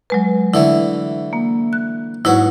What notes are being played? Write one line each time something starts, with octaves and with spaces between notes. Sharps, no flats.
F#3 G#3 B4
D3 E3 A3 E4
A#3
F#6
G#2 F#3 E4 F#4 B4